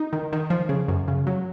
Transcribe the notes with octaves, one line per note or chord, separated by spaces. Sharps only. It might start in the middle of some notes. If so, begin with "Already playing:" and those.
Already playing: D#4
D#3
D#3
F3
C#3
F#2
C#3
F#3